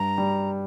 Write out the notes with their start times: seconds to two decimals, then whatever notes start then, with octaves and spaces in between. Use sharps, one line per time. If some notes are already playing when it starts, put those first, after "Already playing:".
Already playing: G2 A#5
0.18 G3